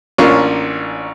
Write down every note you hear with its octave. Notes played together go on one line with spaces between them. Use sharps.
A1 A#3 C#4 D4 F4 C#6